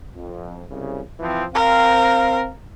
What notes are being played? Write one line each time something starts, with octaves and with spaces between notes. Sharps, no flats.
F2
C2 C#3
E3 F3 C4
C4 A#4 F5